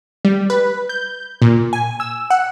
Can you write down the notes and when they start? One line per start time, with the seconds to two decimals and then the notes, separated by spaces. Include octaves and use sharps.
0.25 G3
0.50 B4
0.89 G6
1.42 A#2
1.73 G#5
2.00 E6
2.30 F#5